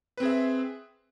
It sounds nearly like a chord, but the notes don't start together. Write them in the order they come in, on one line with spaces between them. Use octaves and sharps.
B4 C4 G#4 E5